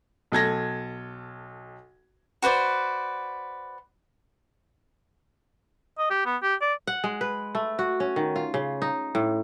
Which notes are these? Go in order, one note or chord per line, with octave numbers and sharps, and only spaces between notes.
B1 A4 G#6 A#6
F#4 B4 C5 D5
D#5
G4
B3
G4
D5
F#5
G#3
B4
A3
F#4
C#4
D#3
F4
C#3
D#4
A2